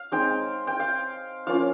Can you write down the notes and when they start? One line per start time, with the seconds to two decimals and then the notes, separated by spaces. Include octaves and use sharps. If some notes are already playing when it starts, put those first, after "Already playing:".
Already playing: F5
0.12 G#3 C4 D#4 G5
0.67 G5
0.80 F5
1.47 F3 A#3 C#4 F4 F5